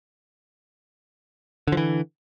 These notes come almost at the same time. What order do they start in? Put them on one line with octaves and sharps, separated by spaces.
D3 F3 E3